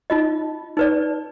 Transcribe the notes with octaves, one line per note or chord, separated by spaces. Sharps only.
D#4 F4 D#5
D#4 B4 D5